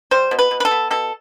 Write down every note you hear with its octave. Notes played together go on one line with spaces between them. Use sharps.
G3 C5
B2
B4
B2
B4
A4
B3
B2 A4